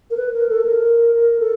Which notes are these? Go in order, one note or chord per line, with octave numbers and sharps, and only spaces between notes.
A#4
B4
A#4
A4
A#4
A#4
A4